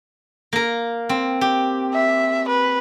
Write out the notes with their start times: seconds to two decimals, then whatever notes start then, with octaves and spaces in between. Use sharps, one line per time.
0.53 A#3 A#4
1.09 C4
1.41 G4
1.93 E5
2.48 B4